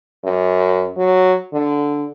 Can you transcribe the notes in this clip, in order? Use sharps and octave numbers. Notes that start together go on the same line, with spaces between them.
F#2
F#3
D3